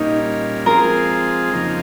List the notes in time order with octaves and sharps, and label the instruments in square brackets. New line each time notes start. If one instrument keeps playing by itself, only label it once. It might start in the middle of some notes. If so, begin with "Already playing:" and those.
Already playing: [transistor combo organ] A#2 G3 A#3 C#4 [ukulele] D#4
[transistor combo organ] F3 G#3 C4 F4 G#4 [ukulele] A#4
[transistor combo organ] F2 C#3 F3 A#3 D#4